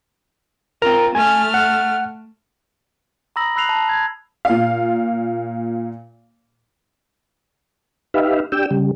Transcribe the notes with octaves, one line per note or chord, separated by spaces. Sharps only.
C4 F4 A#4 A#5
A3 G#5 F6
F#5
A#5 B5 D#6 E6 A#6 F#7
B5 E6 F#6 C7 F7 F#7
A5
G#6
A#2 F5
D#4 G4 B4 E5 F5
D4 G4 G5 E6
C#3 G3